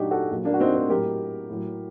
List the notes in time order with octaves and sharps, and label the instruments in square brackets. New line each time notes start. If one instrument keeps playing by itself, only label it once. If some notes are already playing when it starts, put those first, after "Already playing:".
Already playing: [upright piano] A#2 F#3 D4 D#4 F#4 G4
F#4 A4
A#2 F#3
A#3 D4
F#4
C4 D#4
C4 D#4
A2 F#3 G4 A#4
A2 F#3